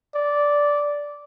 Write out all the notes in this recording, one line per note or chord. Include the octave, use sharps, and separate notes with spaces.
D5